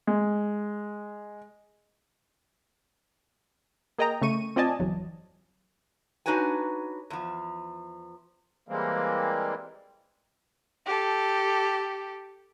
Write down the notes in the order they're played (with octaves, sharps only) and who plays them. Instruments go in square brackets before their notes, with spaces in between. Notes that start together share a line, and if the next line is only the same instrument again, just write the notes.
[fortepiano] G#3
[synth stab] A#3 G#4 D#5 G5 A#5
C#3 A3 C#6 D#7
C4 F4 D5 D#5 G#5 A5
G1 E2 F#3
[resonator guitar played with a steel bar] D4 D#4 F#4 B4 C#5 G#5
E2 F3
[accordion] E3 G3 G#3 A#3 C4
[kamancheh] G4 A4